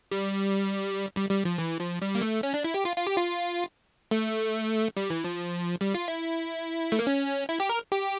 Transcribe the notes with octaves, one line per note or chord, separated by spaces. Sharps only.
G3
G3
G3
F3
E3
F3
G3
A#3
A3
C#4
D4
E4
G4
F4
F4
G4
F4
A3
G3
E3
F3
G3
F4
E4
A3
A#3
C#4
E4
G4
A#4
G4